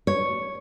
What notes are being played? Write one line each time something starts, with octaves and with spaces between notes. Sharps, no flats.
C#5